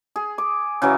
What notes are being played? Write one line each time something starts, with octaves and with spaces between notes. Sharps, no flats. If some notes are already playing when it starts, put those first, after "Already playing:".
G#4
D6
C#3 E3 F#3 E5